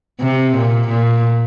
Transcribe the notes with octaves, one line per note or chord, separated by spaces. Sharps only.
C3
A#2
A#2